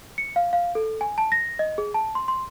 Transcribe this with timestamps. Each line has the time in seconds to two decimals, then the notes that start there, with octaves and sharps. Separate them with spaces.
0.18 C#7
0.36 F5
0.53 F5
0.75 A4
1.01 G#5
1.18 A5
1.32 A#6
1.59 D#5
1.78 G#4
1.94 A5
2.15 C6
2.28 C6